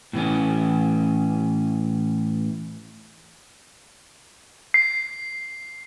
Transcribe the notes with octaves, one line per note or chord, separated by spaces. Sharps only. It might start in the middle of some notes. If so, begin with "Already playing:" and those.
A2 E3 C#4
C7